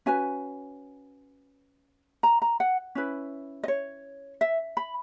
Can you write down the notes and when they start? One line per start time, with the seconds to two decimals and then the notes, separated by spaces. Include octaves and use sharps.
0.06 C#4 F#4 B4 G#5
2.23 A#5
2.42 A#5
2.60 F#5
2.95 C#4 E4 B4
3.63 D#5
3.68 C#5
4.41 E5
4.77 B5